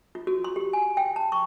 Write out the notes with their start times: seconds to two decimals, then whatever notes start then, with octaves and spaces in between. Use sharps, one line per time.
0.15 F4
0.27 F#4
0.44 C6
0.56 G4
0.73 G#5
0.97 G5
1.16 A5
1.32 C#6